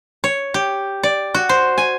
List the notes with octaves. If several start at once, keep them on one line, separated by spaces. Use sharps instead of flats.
C#5
G4
D5
F#4
C5
G#5